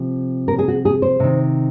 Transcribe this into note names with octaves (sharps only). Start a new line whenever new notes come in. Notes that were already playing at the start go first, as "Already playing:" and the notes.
Already playing: C3 F3
A#4
G#4
F#4
G#4
C5
C3 D#3